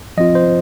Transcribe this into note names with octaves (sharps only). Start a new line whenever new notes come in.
F3 C4 F4 D#5
C5